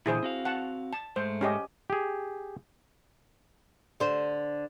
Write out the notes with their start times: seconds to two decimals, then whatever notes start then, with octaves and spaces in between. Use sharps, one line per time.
0.06 A#2 D3 E3 E4 G#4 C5
0.23 C4 F#4 F5
0.45 F#5 A5
0.93 A5
1.16 G#2 G#3 A3 C5
1.41 C#4 G4 D#5
1.90 G4 G#4
4.00 D3 C5